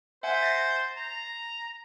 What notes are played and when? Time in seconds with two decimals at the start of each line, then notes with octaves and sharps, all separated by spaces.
0.23 C5 E5 F#5 G#5
0.42 A6 A#6 C7
0.97 A#5